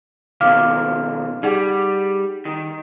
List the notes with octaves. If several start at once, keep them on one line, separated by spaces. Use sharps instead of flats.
B2 D#3 F3 F5 D6 F6
G3 D#4 G#4 F#5
D#3